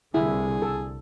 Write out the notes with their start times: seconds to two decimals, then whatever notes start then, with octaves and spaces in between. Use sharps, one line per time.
0.14 C2 D3 E4 G#4
0.62 A4